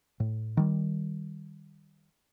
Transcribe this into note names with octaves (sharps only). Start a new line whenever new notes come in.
A2
D#3 G3